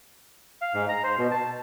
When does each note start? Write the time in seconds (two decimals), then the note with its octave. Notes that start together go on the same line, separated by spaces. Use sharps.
0.61 F5
0.74 G#2
0.89 A#5
1.03 C5
1.18 B2
1.31 A5